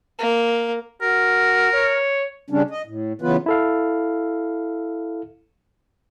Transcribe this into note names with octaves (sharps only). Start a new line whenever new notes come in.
A#3
F#4 A#4
C#5
C#3 G3 C#4 D4
D#5
A2
C#3 E3 F#3 B3 F4 B4
E4 A4 F5